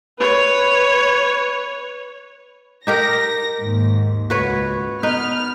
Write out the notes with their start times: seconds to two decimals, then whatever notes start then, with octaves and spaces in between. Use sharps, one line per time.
0.19 B4 C#5
2.87 D#4 G4 A#4 A#6
3.60 D#2 G#2
4.30 C#2 F#4 B4 C#5
5.03 B3 D#4 B4 F6